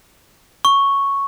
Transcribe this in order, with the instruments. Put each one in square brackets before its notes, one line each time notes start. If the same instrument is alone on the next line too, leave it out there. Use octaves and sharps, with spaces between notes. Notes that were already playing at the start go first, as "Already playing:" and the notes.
[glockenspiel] C#6